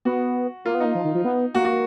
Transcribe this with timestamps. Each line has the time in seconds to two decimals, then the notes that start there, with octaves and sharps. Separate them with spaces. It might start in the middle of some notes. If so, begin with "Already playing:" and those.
0.05 B3 F#4
0.65 A#3 F4
0.75 B3
0.80 A#3 D#4
0.95 F3
1.04 D#3
1.15 F3
1.25 B3
1.55 A#3 F#4
1.65 F#4